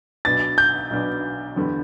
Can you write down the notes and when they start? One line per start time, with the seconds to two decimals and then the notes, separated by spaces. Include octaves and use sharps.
0.25 B1 B2 B3 D4 A6
0.58 G6
0.90 B1 B2 B3 D4
1.56 E2 D3 B3 G4 B4